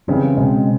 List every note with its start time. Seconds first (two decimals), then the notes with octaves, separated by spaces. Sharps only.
0.08 C#3 E3 G3 C4
0.37 B2 G#3 C4